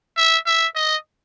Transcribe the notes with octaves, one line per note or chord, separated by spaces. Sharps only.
E5
E5
D#5